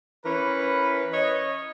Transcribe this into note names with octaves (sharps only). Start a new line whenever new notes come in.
E3 C#4 A#4 B4
C#5 D#5